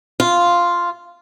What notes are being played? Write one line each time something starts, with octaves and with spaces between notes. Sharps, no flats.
F4